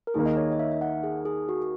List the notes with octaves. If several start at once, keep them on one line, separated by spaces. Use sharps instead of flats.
A#4
D#2 D#3 A#3 G#4
D#5
C#5
D#5
E5
E5
F#5
G#4
G#4
F#4